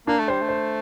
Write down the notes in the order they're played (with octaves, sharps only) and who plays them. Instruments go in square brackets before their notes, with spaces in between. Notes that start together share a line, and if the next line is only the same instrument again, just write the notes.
[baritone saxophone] A#3 [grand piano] D4
[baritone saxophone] A3
[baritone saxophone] G3 [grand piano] C5
[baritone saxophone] A3
[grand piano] C5